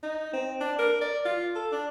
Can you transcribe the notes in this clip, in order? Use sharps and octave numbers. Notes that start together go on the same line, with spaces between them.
D#4
C4
D4
A#4
D5
F4
A4
D4